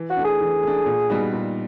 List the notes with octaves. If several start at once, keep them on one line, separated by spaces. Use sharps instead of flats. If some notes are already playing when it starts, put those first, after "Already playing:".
Already playing: E3
F#4
A3 D4
G#4
E3
A3 D4
A#2
G3 B3 D#4 F#4
A#2